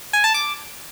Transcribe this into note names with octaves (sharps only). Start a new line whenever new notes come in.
G#5
A5
D6